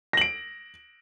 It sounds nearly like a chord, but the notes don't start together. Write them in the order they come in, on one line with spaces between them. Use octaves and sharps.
A#6 F#7 D7